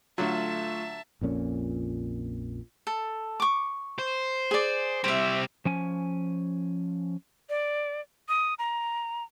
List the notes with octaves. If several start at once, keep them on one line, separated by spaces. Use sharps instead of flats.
D3 F#3 A3 F4 E5 A5
A#1 F2 A#2 C#4
A4
C#6 D6
C5
G#4 D5
G3 C4 C5 E5
F3 C#4 G#5
D5
D#6
A#5